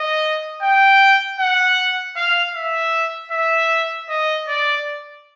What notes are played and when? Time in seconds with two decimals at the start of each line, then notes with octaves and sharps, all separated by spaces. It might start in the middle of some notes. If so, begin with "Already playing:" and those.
Already playing: D#5
0.62 G5
1.40 F#5
2.16 F5
2.55 E5
3.32 E5
4.09 D#5
4.48 D5